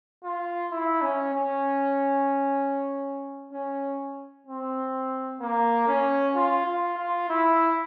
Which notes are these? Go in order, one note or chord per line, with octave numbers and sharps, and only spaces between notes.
F4
E4
C#4
C#4
C#4
C4
A#3
C#4
F4
F4
F4
E4